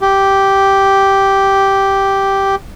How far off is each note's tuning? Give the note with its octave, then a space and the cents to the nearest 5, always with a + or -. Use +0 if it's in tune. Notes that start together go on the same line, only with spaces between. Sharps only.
G4 -5